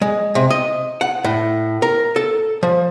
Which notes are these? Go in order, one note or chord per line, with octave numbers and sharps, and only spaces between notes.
G#3
C3
D#5
F#5
A2
A#4
A4
F3